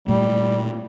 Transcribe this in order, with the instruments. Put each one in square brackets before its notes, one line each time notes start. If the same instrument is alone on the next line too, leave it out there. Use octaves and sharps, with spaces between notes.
[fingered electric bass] A#2 A3 [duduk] G3